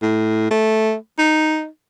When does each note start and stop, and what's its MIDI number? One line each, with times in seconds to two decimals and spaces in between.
0.03 0.48 45
0.51 0.95 57
1.19 1.66 63